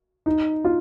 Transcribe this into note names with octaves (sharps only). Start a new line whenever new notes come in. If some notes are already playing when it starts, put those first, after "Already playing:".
D#4
F4